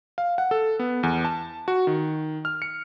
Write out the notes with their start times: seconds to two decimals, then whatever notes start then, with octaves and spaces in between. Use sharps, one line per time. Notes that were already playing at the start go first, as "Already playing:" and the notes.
0.18 F5
0.38 F#5
0.51 A4
0.79 B3
1.03 E2
1.25 A5
1.68 F#4
1.87 D#3
2.45 F6
2.62 C#7